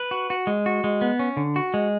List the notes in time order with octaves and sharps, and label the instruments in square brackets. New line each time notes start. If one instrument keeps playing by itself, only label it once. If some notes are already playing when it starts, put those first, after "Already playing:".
Already playing: [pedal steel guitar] B4
F#4
F#4
G#3
F#4
G#3
B3
C#4
D3
F#4
G#3